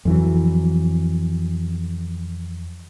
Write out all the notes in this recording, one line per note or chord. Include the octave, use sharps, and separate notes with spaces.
F2 E3 F#3